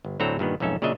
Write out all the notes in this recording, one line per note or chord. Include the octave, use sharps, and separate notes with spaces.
G1
D2 A2 F#3 C4 A4 A#5
G2 A#2 D#3 B3
B1 F2 G#2 C#4 A4 E5
A#2 C#3 F#3 D4 D#5 E5